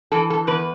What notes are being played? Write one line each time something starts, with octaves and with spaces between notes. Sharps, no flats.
E3 A4
A4
E2 B4